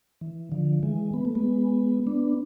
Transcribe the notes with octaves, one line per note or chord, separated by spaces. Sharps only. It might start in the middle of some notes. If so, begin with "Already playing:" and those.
E3
D3 F3
E3 G#3
B3
A3
G#3 B3
B3 D4